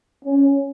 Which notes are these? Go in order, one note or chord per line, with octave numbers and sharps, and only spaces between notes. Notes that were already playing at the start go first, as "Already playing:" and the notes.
C#4